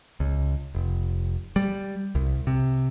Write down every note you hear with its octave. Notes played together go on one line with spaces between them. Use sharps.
C#2
F1
G3
C2
C3